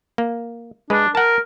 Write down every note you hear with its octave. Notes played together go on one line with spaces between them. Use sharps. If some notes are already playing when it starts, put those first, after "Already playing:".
A#3
G#3 D4 B4
A#4 F#5 A5